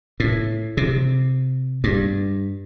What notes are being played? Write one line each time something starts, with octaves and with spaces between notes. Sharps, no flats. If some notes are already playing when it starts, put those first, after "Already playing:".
A2
C3
G2